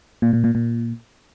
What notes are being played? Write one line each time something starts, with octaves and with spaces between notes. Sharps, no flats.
A#2
A#2
A#2
A#2